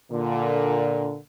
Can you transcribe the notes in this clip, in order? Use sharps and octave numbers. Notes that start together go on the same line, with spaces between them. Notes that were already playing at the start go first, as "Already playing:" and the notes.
A#2 D3